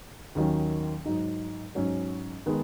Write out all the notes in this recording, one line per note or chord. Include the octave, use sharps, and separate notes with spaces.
D#2 D#3 F#3 C#4
G#2 F#3 D#4
G#2 F#3 C#4
D#3 G#3 B3 D#4